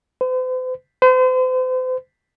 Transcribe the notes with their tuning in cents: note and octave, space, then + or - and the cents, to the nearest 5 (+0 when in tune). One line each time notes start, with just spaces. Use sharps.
C5 -45
C5 -40